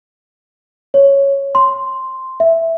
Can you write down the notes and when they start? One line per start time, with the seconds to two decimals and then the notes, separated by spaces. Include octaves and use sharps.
0.94 C#5
1.55 C6
2.40 E5